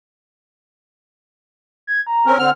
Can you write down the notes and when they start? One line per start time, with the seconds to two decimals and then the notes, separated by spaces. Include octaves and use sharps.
1.87 G#6
2.07 A#5
2.26 C4 C#4 A#4
2.38 D3 C4 F#5 F6